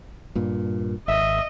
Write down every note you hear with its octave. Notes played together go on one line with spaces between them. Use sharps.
G2 A#2
G#1 D#5 E5